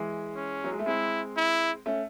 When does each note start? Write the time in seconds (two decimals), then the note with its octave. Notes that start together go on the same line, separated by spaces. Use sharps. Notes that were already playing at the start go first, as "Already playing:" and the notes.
Already playing: E3 G#3
0.36 C#4
0.64 F#3
0.72 G#3
0.79 A3
0.86 G#3 C4 E4
1.37 E4
1.86 A3 C#4